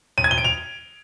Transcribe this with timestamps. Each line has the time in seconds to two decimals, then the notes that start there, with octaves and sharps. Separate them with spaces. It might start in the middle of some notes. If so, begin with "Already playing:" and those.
0.18 D#7
0.24 G#6
0.31 G7
0.38 D7
0.44 F7